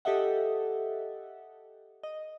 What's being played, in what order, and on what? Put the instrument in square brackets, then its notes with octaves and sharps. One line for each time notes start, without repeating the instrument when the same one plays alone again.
[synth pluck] G4 A4 D#5 E5 F#5
D#5